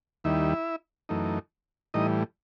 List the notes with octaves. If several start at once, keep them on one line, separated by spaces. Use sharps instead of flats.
D#2 D#3 G3 E4 E5
F#2 E3 A3 D#4
A2 E3 G3 D#4 D#5